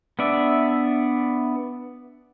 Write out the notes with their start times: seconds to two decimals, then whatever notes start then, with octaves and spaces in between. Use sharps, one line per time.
0.19 B3 D4 D5 E5